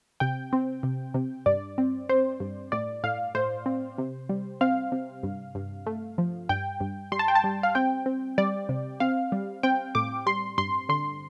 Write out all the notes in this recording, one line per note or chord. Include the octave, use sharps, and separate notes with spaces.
C3 G5
C4
C3
C3
G2 D5
C4
C4 C5
G2
A2 D5
A2 F5
A2 C5
C4
C3
G3
C4 F5
C3
G2
G2
A3
F3
G2 G5
G2
G3 C6
A5
G5
A5
G3
F5
C4 G5
C4
G3 D5
C3
C4 F5
G3
C4 G5
A2 D6
G3 C6
G2 C6
D3 C6